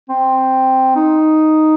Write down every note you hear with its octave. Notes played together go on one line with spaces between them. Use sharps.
C4
D#4